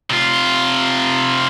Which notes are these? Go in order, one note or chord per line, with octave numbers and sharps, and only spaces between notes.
C3 F4